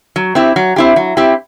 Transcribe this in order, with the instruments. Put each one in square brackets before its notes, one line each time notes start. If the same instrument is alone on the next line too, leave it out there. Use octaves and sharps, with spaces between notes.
[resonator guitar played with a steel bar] F#3
C4 E4 G4
F#3
C4 E4 G4
F#3
C4 E4 G4